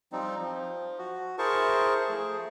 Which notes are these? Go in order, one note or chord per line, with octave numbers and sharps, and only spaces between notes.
F3 G3 C4 D#4
F3
F#4
E4 G#4 A#4 C5 A5 C#6
F3 A3 G#4